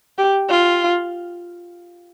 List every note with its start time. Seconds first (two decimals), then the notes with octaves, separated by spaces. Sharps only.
0.18 G4
0.50 F4